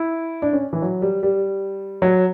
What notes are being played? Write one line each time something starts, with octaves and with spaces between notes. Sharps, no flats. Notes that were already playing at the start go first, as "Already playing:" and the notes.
Already playing: E4
D4
C#4
E3
F#3
G3
G3
F#3